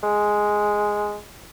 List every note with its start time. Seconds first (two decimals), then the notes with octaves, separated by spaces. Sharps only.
0.03 G#3